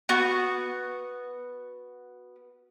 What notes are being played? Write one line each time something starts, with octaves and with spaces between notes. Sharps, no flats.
B3 F#4